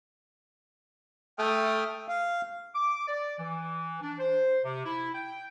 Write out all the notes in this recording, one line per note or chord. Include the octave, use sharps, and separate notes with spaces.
A3 G5 D#6 F6
F5
D6
D5
E3
D4
C5
C3
E4
G5